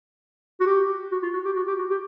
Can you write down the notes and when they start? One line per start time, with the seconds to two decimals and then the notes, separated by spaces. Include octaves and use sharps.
0.60 F#4
0.66 G4
1.12 F#4
1.23 F4
1.33 F#4
1.45 G4
1.56 F#4
1.67 G4
1.79 F#4
1.90 G4